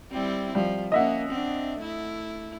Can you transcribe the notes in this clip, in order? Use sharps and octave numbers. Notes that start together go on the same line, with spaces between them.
G3 C4 E4
F3 G3
A#3 C#4 D#5 E5 F#5
C4 D4
A3 E4